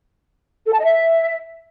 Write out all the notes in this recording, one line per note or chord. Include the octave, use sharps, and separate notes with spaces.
A4
A5
D#5
E5